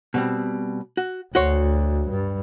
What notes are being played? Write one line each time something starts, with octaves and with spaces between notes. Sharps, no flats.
B2 G3 C4
F#4
D2 F#4 C5 C#5
G2